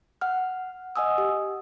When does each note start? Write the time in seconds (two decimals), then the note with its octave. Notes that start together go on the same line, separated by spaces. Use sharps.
0.21 F#5 F6
0.96 D#5 F#5 G#5 D#6 E6
1.18 G4